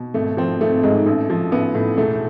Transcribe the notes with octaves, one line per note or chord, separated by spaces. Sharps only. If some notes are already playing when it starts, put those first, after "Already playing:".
Already playing: B2
G#1 A3
F3 C4
G#1 A3
G#2 G#3
A1 A3
F3
A1 B3
A2
E1 A3